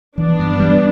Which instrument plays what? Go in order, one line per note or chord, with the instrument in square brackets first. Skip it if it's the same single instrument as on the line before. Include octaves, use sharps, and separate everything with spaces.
[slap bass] E3 [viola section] B3 D4
[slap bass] G2
G3